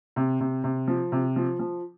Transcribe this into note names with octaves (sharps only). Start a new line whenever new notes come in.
C3
C3
C3
F3
C3
F3
F3